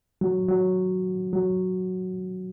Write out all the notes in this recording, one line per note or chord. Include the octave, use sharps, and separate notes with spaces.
F#3
F#3
F#3